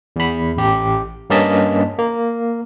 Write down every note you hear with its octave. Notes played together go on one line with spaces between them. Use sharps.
E2 B5
A1 G4
G2 A#3 C#4 D#5 A5 B6
A#3